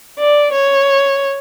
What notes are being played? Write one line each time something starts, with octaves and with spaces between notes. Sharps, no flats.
D5
C#5